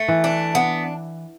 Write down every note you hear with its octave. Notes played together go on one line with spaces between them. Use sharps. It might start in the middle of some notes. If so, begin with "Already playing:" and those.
Already playing: A3
E3
D4
B3